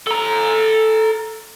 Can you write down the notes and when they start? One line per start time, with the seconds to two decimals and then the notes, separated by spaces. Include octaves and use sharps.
0.07 A4 A#5